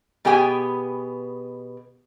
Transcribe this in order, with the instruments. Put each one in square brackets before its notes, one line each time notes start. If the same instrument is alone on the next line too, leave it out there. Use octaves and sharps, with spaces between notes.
[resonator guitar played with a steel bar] B2 B3 G4 G#4 G5 G#5